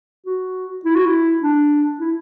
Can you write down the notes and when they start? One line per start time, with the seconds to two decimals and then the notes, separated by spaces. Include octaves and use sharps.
0.26 F#4
0.85 E4
0.96 F#4
1.06 E4
1.43 D4
2.00 E4